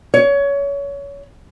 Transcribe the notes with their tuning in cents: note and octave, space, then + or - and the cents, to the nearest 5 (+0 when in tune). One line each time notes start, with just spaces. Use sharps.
C#5 +25